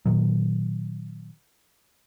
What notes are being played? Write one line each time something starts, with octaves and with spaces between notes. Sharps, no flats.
A#2 D#3 F#3